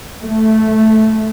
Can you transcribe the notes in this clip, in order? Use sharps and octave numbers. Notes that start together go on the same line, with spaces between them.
A3